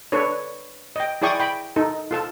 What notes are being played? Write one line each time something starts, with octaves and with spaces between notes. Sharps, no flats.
D4 A4 B4 C#5
D#5 G5
E4 G#4 D5 G5 C#6 D#6
G5 B5
D#4 A4
F4 A4 A5